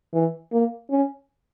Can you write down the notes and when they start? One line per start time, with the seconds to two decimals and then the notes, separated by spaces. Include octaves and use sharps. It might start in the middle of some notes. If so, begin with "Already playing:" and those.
0.13 E3
0.52 A#3
0.90 C#4